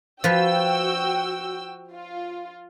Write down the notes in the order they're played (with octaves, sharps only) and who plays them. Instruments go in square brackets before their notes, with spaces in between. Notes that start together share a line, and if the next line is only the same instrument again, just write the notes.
[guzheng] F3 B4 [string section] F#4 G5 E6
[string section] F4